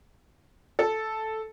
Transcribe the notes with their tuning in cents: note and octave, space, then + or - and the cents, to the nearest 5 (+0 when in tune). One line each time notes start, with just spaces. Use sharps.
A4 -5